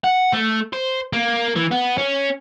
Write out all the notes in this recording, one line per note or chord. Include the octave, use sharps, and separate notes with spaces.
F#5
A3
C5
A#3
E3
B3
C#4